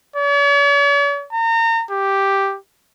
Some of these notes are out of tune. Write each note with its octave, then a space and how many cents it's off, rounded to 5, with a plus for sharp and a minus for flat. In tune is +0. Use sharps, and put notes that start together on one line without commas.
C#5 +45
A#5 -35
G4 +0